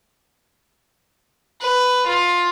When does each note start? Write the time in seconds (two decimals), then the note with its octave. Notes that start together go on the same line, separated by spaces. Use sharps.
1.61 B4
2.07 F4